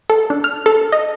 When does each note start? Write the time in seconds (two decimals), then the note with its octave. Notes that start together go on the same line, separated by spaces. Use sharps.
0.10 A4
0.30 D4
0.44 F6
0.66 A4
0.92 D#5